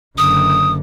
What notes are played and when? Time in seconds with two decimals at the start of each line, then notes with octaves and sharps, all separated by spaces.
0.18 F#1 D3 D#6